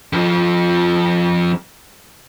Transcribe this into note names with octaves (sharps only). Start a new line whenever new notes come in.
F2 F3